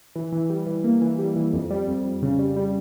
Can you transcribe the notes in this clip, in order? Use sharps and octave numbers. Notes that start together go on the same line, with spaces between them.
E3
E3
G3
E3
A#3
E3
G3
E3
F2
G3
F2
F2
C#3
G3
G3